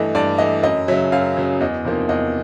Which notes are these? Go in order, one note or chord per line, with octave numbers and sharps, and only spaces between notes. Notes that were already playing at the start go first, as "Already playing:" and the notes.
Already playing: G2 E3 A3 D#5
G2 D5
E3 A3 D#5
F#2 D#5
C#3 F#3 E5
F#2 F5
C#3 F#3
E2 D#5
C3 F3 A#3 D#4
E2 D#5